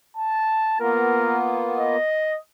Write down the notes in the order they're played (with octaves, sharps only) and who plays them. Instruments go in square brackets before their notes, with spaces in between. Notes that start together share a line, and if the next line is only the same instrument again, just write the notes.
[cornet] A5
[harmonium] A#3 B3 F4 [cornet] A#4
[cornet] D#5